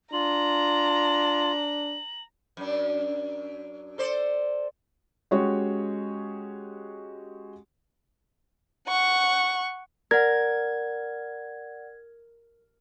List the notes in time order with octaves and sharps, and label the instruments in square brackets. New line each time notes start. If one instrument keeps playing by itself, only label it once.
[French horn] D4 [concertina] F4 [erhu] A#5 [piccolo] F#7
[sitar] F#2 D4
A4 C5 D5
[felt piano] G#3 C#4 F#4 G4 C#5
[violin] F#5 C#6
[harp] A#4 [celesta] D5 F#5 [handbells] G#6